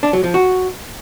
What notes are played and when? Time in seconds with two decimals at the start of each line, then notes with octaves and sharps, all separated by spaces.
0.03 D4
0.13 F#3
0.24 F3
0.34 F#4